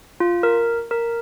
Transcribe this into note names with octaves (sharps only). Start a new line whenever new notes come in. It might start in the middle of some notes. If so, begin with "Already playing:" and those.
F4
A#4
A#4